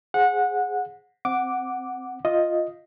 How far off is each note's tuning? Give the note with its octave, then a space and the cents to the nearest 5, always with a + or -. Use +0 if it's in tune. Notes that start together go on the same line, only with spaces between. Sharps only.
G#4 +0 C5 +0 F#5 -20
C4 +0 F#5 +0 D6 -5
F4 +0 D#5 +0